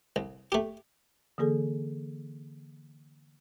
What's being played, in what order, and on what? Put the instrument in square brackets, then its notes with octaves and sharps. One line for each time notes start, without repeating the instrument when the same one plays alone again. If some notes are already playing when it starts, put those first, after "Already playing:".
[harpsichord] C2
A3 G4
[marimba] D3 E3 A#3 G#4 A4